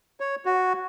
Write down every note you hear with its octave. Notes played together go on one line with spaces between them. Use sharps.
C#5
F#4